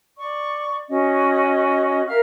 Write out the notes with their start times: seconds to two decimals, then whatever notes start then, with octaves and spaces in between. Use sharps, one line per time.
0.17 D5 C#6
0.88 C#4 F#4 D#5
2.08 A#4 E5 F5 F6